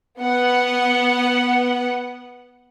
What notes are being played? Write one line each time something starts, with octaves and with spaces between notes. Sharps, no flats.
B3 F#5